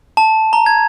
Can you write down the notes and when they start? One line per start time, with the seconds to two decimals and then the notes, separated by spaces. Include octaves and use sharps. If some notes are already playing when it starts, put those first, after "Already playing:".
0.17 A5
0.53 A#5
0.66 G#6